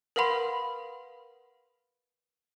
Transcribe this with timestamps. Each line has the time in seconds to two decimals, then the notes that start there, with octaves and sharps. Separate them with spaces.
0.16 A#4 B4 F5 F#5 B5 C6